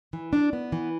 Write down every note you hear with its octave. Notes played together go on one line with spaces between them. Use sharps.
E3
D4
B3
E3